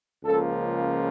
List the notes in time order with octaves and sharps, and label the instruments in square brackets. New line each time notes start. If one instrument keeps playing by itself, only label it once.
[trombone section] C#2 C#3 F3 A#3 A4